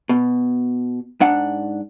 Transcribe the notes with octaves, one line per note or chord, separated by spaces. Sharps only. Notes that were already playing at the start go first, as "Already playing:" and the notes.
B2
G#2 D4 F#5